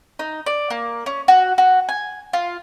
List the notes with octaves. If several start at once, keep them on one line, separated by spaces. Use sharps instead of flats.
D#4
D5
A#3
C#4
F#4
F#4
G#5
F4